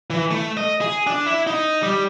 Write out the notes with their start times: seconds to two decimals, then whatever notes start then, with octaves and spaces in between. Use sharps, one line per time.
0.10 E3
0.31 A3
0.57 D#5
0.81 G#4
1.07 D4
1.26 E4
1.47 D#4
1.82 G3